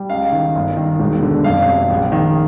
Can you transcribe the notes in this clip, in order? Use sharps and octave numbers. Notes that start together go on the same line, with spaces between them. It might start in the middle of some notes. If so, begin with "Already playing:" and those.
Already playing: G3
C#2 F5
D#3
G1
D#3
E1
D3
F#1 F5
C3
A#1
D#3